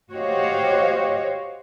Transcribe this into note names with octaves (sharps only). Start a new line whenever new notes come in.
F#4 G4 C5 C#5 D#5 F5